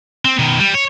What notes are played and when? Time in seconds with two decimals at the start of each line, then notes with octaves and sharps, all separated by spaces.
0.25 C4
0.39 B2 D#3
0.59 G3
0.74 C#5